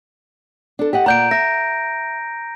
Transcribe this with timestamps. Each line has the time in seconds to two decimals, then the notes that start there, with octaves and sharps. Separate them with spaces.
0.79 D4 A4
0.93 G4 D#5 F#5
1.06 A#2 D5 F#5 A#5 G6 D7
1.31 E5 A#6